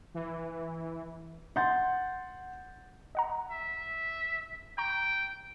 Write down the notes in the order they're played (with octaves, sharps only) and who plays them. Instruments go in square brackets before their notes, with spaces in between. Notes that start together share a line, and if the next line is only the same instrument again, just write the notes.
[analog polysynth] E3
[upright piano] F#5 C6 G6 A6
[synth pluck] D#5 F#5 A#5
[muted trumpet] E5
[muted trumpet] G5 [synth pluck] A#5 C#6